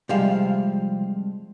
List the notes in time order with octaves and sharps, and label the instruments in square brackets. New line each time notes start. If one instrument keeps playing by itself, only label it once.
[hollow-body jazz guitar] C3 F3 F5 [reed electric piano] G3 G#3